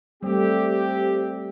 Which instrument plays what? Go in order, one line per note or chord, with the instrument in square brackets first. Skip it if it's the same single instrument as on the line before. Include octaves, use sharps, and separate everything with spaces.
[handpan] G3 A3 [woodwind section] C4 [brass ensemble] G4